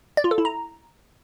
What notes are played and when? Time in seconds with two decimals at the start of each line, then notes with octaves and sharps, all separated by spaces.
0.17 D5
0.24 F4
0.31 A4
0.38 E4
0.45 A#5